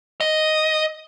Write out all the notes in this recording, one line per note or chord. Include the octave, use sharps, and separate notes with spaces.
D#5